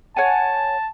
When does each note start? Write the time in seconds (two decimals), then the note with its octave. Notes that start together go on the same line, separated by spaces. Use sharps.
0.17 C#5 F#5 G#5 A5